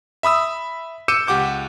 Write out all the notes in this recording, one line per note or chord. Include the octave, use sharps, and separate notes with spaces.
E5 B5 D#6 E6
D6 E6 G6 C#7 D#7 E7
C#2 G4 F#5 D6 G6